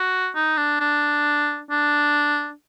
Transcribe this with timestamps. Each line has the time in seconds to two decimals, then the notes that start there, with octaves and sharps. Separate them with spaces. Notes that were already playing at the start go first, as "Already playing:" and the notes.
Already playing: F#4
0.35 D#4
0.57 D4
0.80 D4
1.70 D4